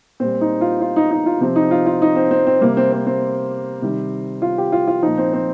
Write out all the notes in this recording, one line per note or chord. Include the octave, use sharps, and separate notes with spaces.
A#2 G3 C4
D#4
F4
F4
D#4
D#4
F4
C3 F3 C4
D#4
F4
F4
D#4
C4
C4
C4
C3 G3 A#3
C4
C4
C4
C3 D#3 G3
F4
G4
F4
F4
A#2 F3 D#4
C4
C4